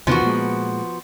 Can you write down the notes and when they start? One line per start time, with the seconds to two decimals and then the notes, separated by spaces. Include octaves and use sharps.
0.07 E2 C3 D#3 F3 B3 F#4
0.22 A#2 G#3